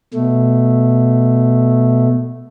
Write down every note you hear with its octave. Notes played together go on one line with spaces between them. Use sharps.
B2 A3